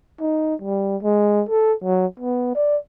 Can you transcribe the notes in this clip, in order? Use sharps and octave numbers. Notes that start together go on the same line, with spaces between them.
D#4
G3
G#3
A4
F#3
B3
D5